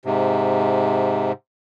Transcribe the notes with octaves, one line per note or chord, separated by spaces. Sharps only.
G#2 C3